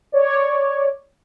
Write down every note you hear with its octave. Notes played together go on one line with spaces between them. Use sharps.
C#5 D5